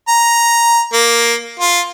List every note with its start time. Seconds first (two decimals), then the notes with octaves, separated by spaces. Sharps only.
0.08 A#5
0.93 A#3
1.60 F4